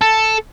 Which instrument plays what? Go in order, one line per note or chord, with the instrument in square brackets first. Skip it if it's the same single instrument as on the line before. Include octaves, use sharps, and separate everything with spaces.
[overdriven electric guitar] A4